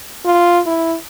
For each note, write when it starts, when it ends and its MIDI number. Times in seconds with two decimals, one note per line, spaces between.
0.25 0.60 65
0.66 0.95 64